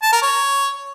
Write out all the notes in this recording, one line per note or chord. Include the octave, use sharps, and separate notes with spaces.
A5
A#4
C#5